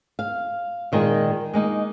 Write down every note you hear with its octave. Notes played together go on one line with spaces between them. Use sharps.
F5
A#2 D#3 G#3 F4 D5 D#5
G#3 A#3 D#4